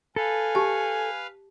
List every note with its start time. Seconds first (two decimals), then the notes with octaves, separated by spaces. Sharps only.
0.16 A4 B4 F5 G#5
0.55 G4 A5